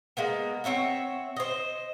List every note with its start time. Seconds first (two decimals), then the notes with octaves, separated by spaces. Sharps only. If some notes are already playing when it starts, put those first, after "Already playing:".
0.17 G#3 A#3 B3
0.64 C4 C#5 E5 F#5
1.36 C5 D#5